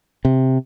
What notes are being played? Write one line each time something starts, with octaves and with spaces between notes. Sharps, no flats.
C3